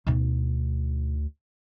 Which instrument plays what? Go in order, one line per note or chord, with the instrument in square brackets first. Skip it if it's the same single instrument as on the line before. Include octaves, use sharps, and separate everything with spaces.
[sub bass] D2 [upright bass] B2 D#4